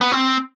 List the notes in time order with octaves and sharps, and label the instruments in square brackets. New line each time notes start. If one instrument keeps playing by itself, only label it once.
[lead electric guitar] B3
C4